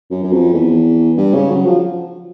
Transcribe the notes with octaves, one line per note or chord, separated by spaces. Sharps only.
F#2
F#2
F2
E2
G2
C#3
F#3
F3